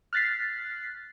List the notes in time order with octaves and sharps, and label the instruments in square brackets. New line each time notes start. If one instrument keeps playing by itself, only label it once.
[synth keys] F6 F#6 A6 B6 C7